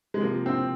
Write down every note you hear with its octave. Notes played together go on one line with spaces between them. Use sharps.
G#3
C3 F3 A#3
C4